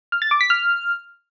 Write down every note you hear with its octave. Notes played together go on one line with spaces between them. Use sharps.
F6
A6
D6
B6
F6